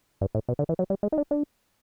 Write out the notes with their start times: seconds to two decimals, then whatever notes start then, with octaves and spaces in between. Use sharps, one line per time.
0.21 G2
0.35 A2
0.49 B2
0.59 D3
0.69 E3
0.79 F#3
0.90 G3
1.03 G#3
1.12 D#4
1.18 D4
1.31 D4